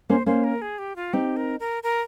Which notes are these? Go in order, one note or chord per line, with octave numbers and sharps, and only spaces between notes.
A#3 C#4 C5
A#3 C#4 C5
A#4
G#4
G4
F4
C4 D#4 G4
A#4
A#4
A#4